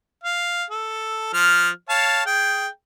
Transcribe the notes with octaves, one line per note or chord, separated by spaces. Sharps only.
F5
A4
F3 F6
C#5 F5 A5
G#4 G5